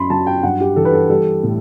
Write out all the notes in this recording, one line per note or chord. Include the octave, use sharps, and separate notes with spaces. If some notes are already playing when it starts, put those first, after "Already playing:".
Already playing: F#2 B5 C6
F#3 A5
G5
G2 F#5
G4
E3 A4
B4
A4
G3 A4
A2